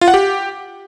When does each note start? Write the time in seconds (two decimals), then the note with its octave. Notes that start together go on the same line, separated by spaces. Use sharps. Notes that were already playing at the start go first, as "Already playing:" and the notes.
0.01 F4
0.08 F#5
0.14 G4